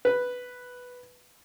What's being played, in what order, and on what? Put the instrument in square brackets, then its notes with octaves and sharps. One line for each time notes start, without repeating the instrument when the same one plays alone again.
[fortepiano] B4